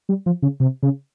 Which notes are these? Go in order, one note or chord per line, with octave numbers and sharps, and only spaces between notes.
G3
F3
C#3
C3
C#3